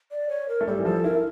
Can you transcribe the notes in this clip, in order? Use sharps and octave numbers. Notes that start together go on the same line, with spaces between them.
D5
C#5
A#4
A3
G3 A4
E3
F3 A4
E4 A#4